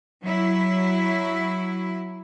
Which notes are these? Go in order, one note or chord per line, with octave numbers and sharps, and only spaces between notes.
F#3 E4